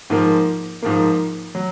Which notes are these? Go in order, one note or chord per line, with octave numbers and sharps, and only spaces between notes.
G#2 F3 A#3
G#2 F3 A#3
F#3